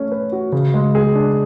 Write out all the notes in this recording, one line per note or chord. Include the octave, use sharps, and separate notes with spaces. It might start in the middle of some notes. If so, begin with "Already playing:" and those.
Already playing: A3 C#4
B4
F#4
C#3
G#3
G#4
D4